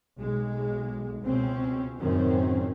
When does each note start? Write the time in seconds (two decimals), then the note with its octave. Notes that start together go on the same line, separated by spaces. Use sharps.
0.18 B1 G#3
1.22 C#2 B2 C4 C#4
1.98 C#2 F#2 A2 D#3 C4 C#4